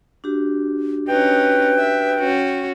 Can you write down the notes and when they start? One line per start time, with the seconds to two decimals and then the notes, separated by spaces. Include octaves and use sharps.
0.24 D4 F#4 G4
1.08 C#4 D#4 B4 G5
1.79 E5
2.19 C#4 F#4